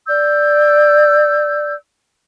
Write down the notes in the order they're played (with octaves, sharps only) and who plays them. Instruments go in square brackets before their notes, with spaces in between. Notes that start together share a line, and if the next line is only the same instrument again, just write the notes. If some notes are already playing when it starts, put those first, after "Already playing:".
[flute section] D5 E6 G6